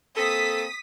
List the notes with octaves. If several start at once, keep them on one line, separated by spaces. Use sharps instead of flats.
A#3 C4 A4 D#6 B6